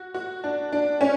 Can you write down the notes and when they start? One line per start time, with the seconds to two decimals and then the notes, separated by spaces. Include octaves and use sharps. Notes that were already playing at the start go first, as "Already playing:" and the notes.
Already playing: F#4
0.14 F#4
0.44 D4
0.72 D4
1.01 C#4